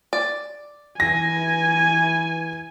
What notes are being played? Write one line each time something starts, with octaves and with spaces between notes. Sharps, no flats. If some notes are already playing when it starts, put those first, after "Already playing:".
D5
E3 G#5 A#6